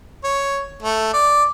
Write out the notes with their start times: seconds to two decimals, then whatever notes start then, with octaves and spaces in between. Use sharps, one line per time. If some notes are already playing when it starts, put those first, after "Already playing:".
0.24 C#5
0.82 A3
1.13 D5